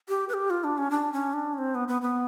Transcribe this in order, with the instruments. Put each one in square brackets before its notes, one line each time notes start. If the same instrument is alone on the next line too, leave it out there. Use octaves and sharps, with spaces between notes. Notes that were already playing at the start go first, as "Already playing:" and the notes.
[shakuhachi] G4
B4
G4
F4
D4
C#4
D4
C#4
D4
C#4
C4
B3
B3
B3